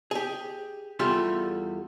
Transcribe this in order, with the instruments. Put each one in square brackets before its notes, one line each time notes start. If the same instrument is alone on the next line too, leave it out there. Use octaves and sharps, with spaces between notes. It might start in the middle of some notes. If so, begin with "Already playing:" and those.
[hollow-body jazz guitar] G4 G#4
E2 G3 A3 F4 G4 C6